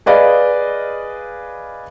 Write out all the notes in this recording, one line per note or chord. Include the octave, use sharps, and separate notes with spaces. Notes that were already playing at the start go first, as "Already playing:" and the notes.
G#4 B4 D5 D#5 F5